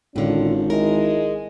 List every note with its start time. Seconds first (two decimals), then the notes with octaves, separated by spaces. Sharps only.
0.16 G#1 A2 D3 C#4 F4
0.70 G#3 E4 A#4